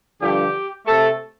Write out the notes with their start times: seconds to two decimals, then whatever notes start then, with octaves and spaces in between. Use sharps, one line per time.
0.20 G2 D3 F3 G4
0.86 C3 A3 A4